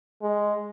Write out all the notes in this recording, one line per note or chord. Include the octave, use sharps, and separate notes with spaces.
G#3